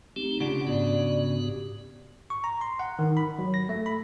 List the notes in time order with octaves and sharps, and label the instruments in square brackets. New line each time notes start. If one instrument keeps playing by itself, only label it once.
[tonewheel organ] A3 C4 G4 [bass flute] D#4
[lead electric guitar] C#3 D4 [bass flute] F4 [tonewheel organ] G4 F#5
[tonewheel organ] G#2 B3 F#4 [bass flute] D5
[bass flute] G4
[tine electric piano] C#6
A#5
C6
F#5
D#3
B5
F#3
A#6
A3
B5